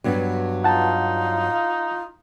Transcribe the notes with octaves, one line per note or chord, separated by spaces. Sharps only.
G2 F#3 B3
D#4 F4 F#5 A5